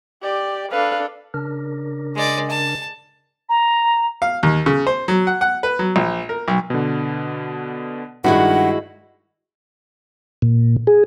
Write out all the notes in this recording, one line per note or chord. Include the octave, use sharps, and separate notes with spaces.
G4 D5
D4 A4 B4 F5
C#3 D4 A#4
G#3 D5
A5
A#5
F5
D#2
C#3
C5
F#3
F#5
F#5
B4
F#3
A#1
A#4
B1
B2 D3
G2 D#3 G#3 E4 F#4 F#5
A#2
G#4